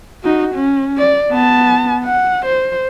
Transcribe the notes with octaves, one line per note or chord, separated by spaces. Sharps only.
D#4 F#4
C#4
D5
B3 A5
F#5
C5